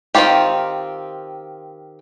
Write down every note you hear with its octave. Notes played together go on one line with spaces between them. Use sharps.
D#3 F#3 C4 F4 G4